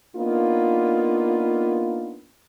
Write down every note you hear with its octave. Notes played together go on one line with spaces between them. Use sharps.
A#3 B3 D4 D#4 F4